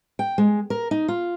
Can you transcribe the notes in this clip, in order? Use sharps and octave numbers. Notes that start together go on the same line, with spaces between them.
G5
G#3
A#4
D#4
F4